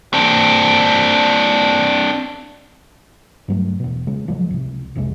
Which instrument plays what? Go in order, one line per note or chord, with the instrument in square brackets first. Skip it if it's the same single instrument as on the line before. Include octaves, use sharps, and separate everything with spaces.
[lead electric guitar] C4 D4
[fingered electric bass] G2 F#3 A3
E1 B2
C#3 G#3
A1 F3 F#3 G#3
C#2 C3
A#1 F2 C3 G#3